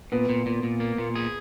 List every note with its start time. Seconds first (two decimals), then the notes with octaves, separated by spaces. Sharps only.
0.12 A#2 B3
0.29 A#2
0.46 A#2
0.63 A#2
0.80 A#3
0.98 A#2
1.15 G#4